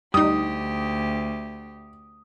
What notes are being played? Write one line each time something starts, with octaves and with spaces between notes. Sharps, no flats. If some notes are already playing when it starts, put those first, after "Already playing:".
D2 G3 D#4 G4 D#6